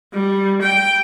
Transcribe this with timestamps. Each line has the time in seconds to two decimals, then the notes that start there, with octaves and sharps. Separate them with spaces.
0.13 G3
0.61 G5